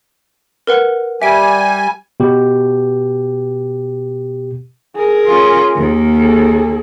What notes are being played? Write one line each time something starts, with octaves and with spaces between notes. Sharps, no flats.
A#4 B4 F#5
G3 E5 G#5 D7
B2 G4
G#4 A#4
C#4 F4
D#2 A#3
G#4 A4